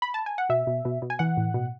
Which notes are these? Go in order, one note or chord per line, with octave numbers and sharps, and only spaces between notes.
B5
A5
G#5
F#5
B2 E5
B2
B2
B2
G#5
E3 F#5
A2
B2